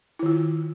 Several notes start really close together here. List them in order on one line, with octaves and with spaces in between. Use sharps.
E4 D#3 F4